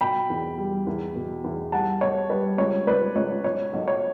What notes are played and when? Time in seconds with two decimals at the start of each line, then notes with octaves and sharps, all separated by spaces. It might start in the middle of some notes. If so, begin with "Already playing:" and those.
0.01 B2 G5 B5
0.30 E2
0.58 G3
0.87 E2
1.15 B2
1.44 E2
1.72 G3 F#5 A5
2.01 B1 C#5
2.30 G3 B4
2.58 C#2 C#5
2.87 C#2 B4 D5
3.16 C#2 C#5
3.44 B1 C#5
3.73 B1
3.88 C#5